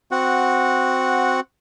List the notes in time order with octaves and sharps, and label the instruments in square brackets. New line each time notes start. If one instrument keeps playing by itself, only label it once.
[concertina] C4 F#4 F#5